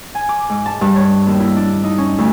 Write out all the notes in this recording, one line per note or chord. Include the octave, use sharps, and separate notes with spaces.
G#5
D6
G#2
A5
G2
C#5
D#2
E4
D4
D#4
C#4
D2